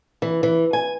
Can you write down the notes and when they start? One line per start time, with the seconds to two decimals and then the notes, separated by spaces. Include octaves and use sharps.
0.22 E3
0.43 E3
0.73 G#5